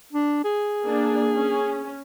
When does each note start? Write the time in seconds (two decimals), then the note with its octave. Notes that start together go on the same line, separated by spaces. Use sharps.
0.13 D4
0.44 G#4
0.83 A#3 D4
1.36 C#4